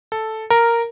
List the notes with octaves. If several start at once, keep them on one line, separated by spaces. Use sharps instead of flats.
A4
A#4